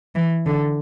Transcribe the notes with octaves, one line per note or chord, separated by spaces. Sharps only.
E3
D3